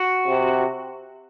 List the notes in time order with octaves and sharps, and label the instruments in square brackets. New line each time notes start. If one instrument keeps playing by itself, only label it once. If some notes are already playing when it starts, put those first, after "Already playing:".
Already playing: [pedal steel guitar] F#4
[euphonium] C3